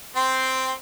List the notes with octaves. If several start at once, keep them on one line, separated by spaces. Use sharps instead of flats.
C4 G5 C6